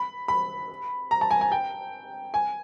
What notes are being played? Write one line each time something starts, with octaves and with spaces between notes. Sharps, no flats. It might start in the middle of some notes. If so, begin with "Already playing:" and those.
Already playing: B5
B5
A#5
A5
G#5
G#5
G5
G#5